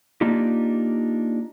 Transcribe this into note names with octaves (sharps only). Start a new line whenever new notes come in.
A#3 D4 D#4 F4 G4